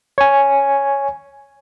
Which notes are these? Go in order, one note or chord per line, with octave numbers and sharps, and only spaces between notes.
C#5 G#5